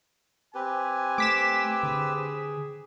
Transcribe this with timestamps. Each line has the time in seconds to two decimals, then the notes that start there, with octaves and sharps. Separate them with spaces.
0.55 C4 G4 B4 G#5
1.18 A3 D6 B6 E7
1.83 D3 G#4